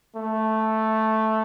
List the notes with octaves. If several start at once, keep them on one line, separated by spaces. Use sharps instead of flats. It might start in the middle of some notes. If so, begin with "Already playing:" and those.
A3